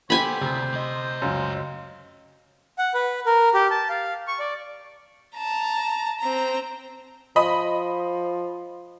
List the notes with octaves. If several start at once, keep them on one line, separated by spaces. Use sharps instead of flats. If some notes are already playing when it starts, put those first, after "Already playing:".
B3 G4 A4 C5 G#5 B5
D2 C3
D2 D#5
C#2 F#2
F#5
B4
A#4
G4
A5
F5
C#6
D5
A5 A#5
C4 A#5
F3 D#5 B5 D#6